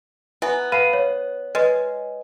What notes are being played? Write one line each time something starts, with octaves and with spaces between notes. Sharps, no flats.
B3 E4 E5 G#5
B4 F5 F#5 A5 B5 D#7
C#5
G#3 B4 D#5